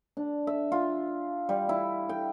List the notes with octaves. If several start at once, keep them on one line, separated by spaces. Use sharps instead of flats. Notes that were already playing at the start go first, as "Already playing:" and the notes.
D4
E5
F4
G3
E4
G5